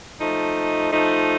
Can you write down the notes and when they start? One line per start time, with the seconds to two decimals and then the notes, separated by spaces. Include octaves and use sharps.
0.19 F3 A3 D#4
0.91 F3 A3 D#4